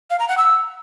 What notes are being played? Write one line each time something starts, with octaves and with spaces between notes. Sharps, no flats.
F5
A#5
F#5
E6